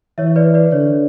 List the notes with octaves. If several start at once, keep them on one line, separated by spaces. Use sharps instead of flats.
E3 C#5 E5
B4 D5
B4 D5
D3 C#5